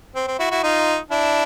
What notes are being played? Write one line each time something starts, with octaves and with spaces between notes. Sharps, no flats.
C4
C4
E4 F#4
E4 F#4
D#4 F4
D4 E4